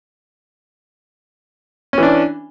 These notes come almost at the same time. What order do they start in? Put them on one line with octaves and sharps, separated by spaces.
C#4 E3 D4